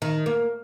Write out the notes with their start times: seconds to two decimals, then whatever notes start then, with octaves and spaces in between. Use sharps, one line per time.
0.02 D#3
0.26 A#3